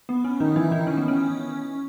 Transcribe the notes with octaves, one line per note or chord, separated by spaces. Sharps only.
B3
C#4
D#3 D#4
E3 E4
D#3 D#4
C#4
B3
C#4